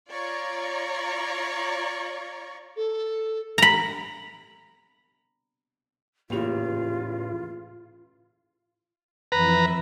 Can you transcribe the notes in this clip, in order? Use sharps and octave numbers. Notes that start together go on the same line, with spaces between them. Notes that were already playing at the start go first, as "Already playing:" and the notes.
F4 C#5 D5 A#5 C#6
A4
A#5 B5
E2 A2 C#3 E3 A#3 F4 G4 F7
F2 E3 B4 E5 A#5